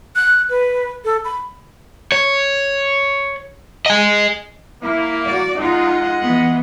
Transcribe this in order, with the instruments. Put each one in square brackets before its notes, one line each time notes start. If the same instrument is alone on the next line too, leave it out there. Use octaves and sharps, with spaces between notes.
[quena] F#6
B4
A4
B5
[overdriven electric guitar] C#5
D#5 G#5
[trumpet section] A#3 [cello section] E4
[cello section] F#4 D5
[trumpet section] G#3 D#5 F#5 [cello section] D#4 F4
[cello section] E3 B3